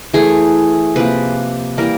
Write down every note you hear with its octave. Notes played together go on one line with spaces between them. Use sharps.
E3 A3 G#4
C3 F3 A#3 B4
E3 G3 A#3 A#4